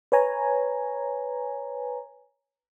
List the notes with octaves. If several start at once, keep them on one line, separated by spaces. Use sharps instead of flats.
B4 C#5 G#5 A#5